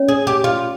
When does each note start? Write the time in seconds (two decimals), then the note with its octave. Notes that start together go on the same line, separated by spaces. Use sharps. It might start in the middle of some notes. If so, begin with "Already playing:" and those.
Already playing: C#4 C#5
0.08 G#4
0.27 G4
0.44 F4